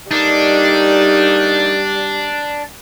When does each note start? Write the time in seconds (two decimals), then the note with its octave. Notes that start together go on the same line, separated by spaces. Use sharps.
0.11 G3 A3 A#3 D4 D#4